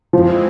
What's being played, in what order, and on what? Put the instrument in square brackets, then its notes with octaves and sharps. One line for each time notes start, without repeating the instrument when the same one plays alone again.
[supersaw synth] F2 E3 G#3 C4 [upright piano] F3